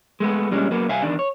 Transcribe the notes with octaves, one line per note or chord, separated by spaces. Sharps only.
G#3 A3 B3
G2 A#2 G3 G#3 C#4
F#3 A#3 B3
C2 E5 F5 G#5
E2 D#3 D4
C#5